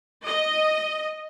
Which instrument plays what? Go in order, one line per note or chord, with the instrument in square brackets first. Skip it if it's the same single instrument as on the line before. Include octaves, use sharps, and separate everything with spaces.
[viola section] D#5